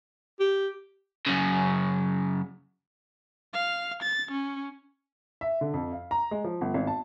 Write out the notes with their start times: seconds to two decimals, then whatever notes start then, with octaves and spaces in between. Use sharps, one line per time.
0.40 G4
1.26 F#2 C#3
3.54 F5
4.03 A6
4.31 C#4
5.41 E5
5.61 D3
5.74 F2
5.92 F5
6.11 A#5
6.31 G#3
6.44 F3
6.61 G1
6.74 G#1
6.87 A5